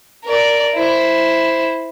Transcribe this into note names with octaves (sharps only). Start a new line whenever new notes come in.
A#4 D5
E4 C5